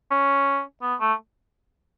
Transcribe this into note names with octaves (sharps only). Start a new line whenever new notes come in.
C#4
B3
A3